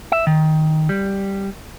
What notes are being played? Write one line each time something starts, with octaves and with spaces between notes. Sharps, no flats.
E5
D#3
G3